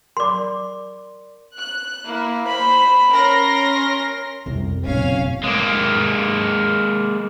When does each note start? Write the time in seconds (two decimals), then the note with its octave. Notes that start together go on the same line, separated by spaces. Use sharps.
0.17 A#4 D5 C6 D6
1.58 F#6
2.05 A#3 E4
2.47 C5 B5
3.12 C#4 A#4 C6 A#6
4.46 C2 F2
4.87 F#1 B2 C4 C#4 F5
5.43 G#3 A#3